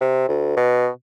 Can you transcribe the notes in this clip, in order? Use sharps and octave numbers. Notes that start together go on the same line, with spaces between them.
C3
D2
B2